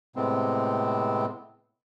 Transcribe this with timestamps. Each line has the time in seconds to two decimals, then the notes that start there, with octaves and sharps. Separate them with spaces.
0.16 A2 C3 G#3 B3 C4